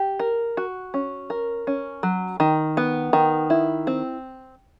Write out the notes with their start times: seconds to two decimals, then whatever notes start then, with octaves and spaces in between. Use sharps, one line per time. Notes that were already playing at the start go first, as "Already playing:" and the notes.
Already playing: G4
0.19 A#4
0.57 F#4
0.94 C#4
1.30 A#4
1.67 C#4
2.03 F#3
2.40 D#3
2.77 B3
3.13 D#3
3.50 E4
3.87 C4